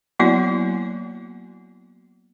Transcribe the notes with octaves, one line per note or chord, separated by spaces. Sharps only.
F#3 A#3 B3 E4 F#4 D5